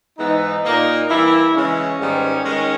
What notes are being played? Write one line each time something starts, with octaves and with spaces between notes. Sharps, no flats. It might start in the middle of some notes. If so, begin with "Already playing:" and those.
G#2 E3 G#3 B3 D#4
A#2 A#3
G2 E3 A#3 E4
C#3 E3 G#3 C#4
G#2 D#3 G3 B3
D#3 G#3